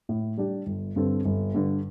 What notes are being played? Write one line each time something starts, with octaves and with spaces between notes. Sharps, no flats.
A2
G3 D4 G4
G1
G2 D3 C4 A4
G1
G2 D3